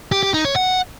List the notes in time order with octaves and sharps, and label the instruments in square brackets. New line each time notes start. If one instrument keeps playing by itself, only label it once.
[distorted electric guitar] G4
G4
D#4
C#5
F#5